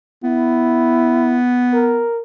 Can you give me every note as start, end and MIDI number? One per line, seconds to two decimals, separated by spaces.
0.24 2.06 59
0.24 1.39 64
1.74 2.22 70